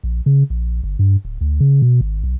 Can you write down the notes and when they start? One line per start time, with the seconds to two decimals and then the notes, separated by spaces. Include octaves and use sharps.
0.03 A#1
0.26 C#3
0.50 A#1
0.83 G1
0.99 G2
1.25 D1
1.41 D2
1.60 C#3
1.82 B2
2.01 G#1
2.24 B1